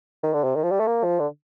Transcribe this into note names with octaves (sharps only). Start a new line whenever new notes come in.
D#3
D3
C3
D#3
F3
G3
A3
A#3
F3
D3